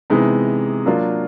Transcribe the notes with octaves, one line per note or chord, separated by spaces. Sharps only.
C3 E3 G#3 B3 D#4
F#3 A#3 D4 F4